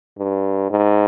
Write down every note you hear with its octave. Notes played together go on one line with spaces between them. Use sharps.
G2
G#2